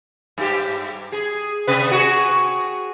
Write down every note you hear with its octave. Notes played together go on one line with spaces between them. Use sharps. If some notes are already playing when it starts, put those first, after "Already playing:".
G2 G4
G#4
C3 B4
F#4 G#4